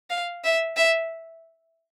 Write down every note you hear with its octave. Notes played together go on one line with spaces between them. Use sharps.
F5
E5
E5